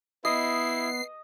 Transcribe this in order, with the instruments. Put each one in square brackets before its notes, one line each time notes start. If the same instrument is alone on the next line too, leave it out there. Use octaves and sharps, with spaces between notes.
[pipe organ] B3 [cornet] E4 [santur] D#5 [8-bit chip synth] C7